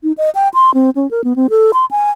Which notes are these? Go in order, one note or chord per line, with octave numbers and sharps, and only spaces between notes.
D#4
D#5
G5
C6
C4
C#4
A#4
B3
C4
A4
C6
G#5